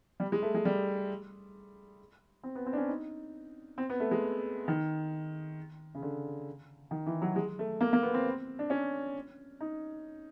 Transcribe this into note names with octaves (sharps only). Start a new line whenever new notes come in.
G3
G#3
A3
G#3
G3
C4
B3
C4
D4
C#4
D#4
C4
B3
A3
G#3
D#3
C#3
D3
D#3
E3
F#3
G#3
A3
A#3
A#3
B3
C4
D4
C#4
D#4